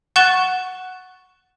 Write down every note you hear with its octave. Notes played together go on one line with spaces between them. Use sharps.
F#5 C#6 F#6 A6 E7 G7